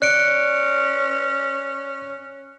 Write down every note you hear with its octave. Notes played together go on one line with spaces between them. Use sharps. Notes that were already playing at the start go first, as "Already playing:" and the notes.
C#4 D5 F#6 C#7 D7